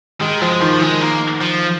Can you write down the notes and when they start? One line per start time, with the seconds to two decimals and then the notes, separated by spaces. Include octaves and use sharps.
0.21 D#3 G#3
0.41 F3 G#3
0.61 D#3 F3
0.81 D#3 G#3
1.01 A#3
1.41 F3